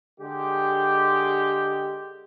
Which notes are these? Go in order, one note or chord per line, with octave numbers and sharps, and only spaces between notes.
D3 G#3 G4